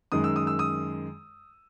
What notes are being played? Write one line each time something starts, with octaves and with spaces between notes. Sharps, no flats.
F#2 D#3 G#3 D#6
E6
D#6
E6
D#6